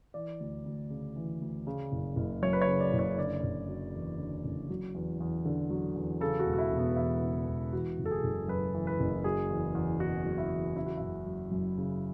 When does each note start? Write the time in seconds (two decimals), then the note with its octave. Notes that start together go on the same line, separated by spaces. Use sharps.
0.14 E3 D5
0.40 D2
0.65 D2
0.90 C#3
1.16 E3
1.41 D2
1.67 C#3
1.92 F#1
2.16 F#1
2.42 F#2 C#5
2.53 B4
2.61 C#5
2.68 C#3
2.80 D5
2.93 F#1
2.99 C#5
3.18 D3 D5
3.43 F#1
3.68 F#3
3.93 E2
4.19 D3
4.44 F#1
4.70 F#3
4.95 E2
5.20 E2
5.45 D3
5.70 F#3
5.96 E2
6.21 C#3 A4
6.40 F#4
6.46 E1
6.53 F#4
6.58 E4
6.72 E1
6.78 B3
6.96 E2 E4
7.22 C#3
7.48 E1
7.73 E3 F#4
7.99 F#1
8.06 A4
8.11 G#4
8.24 F#1
8.48 F#2 B4
8.75 E3
8.87 B4
9.00 F#1
9.24 F#3 G#4
9.49 E2
9.75 E2
10.00 B2 F#4
10.25 F#3
10.38 E4
10.51 E2
10.76 C#3 E4
10.86 F#4
10.97 F#1 E4
11.26 F#3
11.51 F#2
11.78 C#3